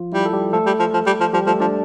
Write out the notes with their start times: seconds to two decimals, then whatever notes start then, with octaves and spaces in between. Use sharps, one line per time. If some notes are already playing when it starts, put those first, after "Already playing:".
Already playing: F3 F4
0.13 G3 E4
0.26 A4
0.33 G3 G4
0.53 F3 A3 A4
0.66 G3
0.79 F3
0.93 F3
1.06 G3
1.20 F3
1.33 F3 G3 G4
1.46 F3 A3 A4
1.60 F3 D4 D5